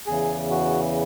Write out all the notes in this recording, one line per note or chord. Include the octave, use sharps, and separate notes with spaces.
E2 C#3 E3 G#4
F#4